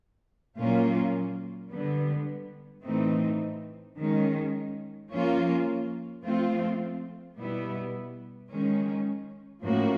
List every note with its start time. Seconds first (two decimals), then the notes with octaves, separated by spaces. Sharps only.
0.58 A#2 F#3 A#3 C#4 F4
1.71 D3 G3 B3
2.84 A2 E3 A3 C4 D#4
3.97 D#3 G#3 C#4
5.11 F3 A#3 C#4 F4
6.23 F3 A3 C4 F4
7.36 B2 G3 B3 E4
8.50 D#3 G#3 C#4
9.63 A2 F3 A#3 C#4 F#4